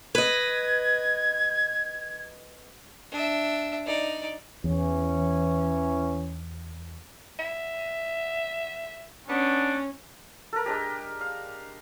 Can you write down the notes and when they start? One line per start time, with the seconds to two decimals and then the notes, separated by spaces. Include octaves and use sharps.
0.15 B4 D#5 G#6
3.12 D4 E5
3.86 D#4 D5
4.64 E2 E3 C#4
7.39 E5
9.29 B3 C#4 D4
10.53 A4 A#4
10.66 G#3 D4 G4
11.21 F5